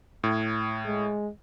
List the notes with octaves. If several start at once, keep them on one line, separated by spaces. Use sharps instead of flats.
A2
G#3